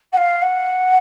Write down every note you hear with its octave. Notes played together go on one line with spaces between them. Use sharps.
F#5
F5
F#5